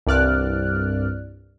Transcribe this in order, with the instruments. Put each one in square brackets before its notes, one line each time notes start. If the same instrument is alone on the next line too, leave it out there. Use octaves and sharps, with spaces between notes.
[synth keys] C2 G2 D5 F6 F#6